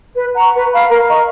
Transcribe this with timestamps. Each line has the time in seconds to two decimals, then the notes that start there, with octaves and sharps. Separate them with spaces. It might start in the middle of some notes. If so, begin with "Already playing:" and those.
0.16 B4
0.35 F#5 A#5 C#6
0.53 B4
0.71 F5 B5
0.89 A#4
1.08 D#5 A#5 C#6